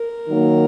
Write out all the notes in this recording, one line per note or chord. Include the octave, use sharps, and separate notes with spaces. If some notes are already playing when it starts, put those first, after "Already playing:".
Already playing: A#4
D#3 F#3 A#3